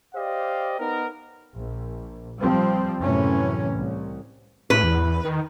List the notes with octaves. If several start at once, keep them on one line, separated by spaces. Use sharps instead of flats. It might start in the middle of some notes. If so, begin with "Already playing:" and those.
G4 C5 D5 D#5 F5
B3 D#4 A#4
A#1
F3 G3 C4
F#2 A2 C3 E3 C#4
C2
A2 B4
E2
D#3